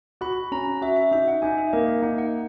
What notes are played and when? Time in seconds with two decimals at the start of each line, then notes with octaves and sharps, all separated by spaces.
0.21 F#4 B5
0.52 C#4 A#5
0.82 F#4 E5
0.96 E5
1.11 D#4 E5
1.28 F#5
1.42 D#4 G#5
1.58 E5
1.73 A#3 D#5
1.87 D#5
2.02 D#4 F#5
2.18 F#5